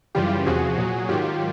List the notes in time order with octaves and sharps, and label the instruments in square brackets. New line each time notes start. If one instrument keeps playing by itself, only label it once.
[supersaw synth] F#2 C#3 E3 G3 F4 G4
E2 C3 F3 F#4 G#4
A#2 F#3
G#2 D#3 F#3 F4 G4